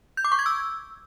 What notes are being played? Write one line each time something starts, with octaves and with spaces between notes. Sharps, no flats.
G6
D6
C#6
G#6
E6